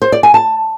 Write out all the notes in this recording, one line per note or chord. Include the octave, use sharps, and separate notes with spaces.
C5
D5
G#5
A5